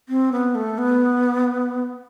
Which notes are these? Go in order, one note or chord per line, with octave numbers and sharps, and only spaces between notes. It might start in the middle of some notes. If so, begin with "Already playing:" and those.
C4
B3
A3
B3